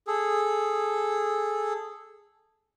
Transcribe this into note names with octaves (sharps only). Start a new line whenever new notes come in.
G#4 A4